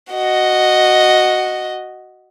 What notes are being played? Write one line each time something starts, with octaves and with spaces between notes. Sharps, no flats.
F#4 D#5